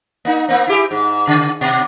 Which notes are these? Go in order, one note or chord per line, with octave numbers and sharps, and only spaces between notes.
A#3 D#4
A#3 C4
E4 G4 G#4
G#2
C#3
B2